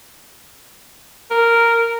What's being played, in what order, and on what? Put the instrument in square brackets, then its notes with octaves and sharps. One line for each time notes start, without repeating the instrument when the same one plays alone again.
[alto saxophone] A#4